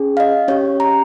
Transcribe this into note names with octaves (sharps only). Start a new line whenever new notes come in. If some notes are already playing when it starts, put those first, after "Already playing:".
Already playing: C#4 G#4
F5
D#5
C#4 G4 C#5
A#5